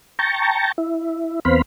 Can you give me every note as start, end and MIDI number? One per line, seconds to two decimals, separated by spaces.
0.19 0.72 79
0.19 0.72 81
0.19 0.72 82
0.19 0.72 85
0.78 1.40 64
1.45 1.62 40
1.45 1.62 59
1.45 1.62 60
1.45 1.62 72
1.45 1.62 77
1.45 1.62 83